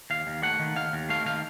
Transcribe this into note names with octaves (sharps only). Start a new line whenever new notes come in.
D#2 F5
D#2
A3 F#5
D#3
D#2 F5
D#2
A3 F5
D#3 F5